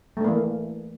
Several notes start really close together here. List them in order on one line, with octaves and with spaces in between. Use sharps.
A3 D4 A#3 E3